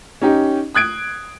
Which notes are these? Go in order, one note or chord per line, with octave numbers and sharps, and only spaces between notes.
C#4 D#4 G4
D#6 F#6 G#6 D7